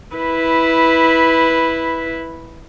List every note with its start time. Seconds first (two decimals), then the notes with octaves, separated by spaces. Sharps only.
0.16 E4 B4